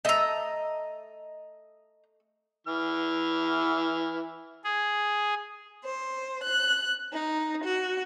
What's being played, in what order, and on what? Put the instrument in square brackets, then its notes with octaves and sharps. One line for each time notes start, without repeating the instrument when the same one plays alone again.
[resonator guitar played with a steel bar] A3 A4 E5 [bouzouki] D#5 A#5
[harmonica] E3 F6
[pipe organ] G#4
[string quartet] C5
F#6
D#4
F#4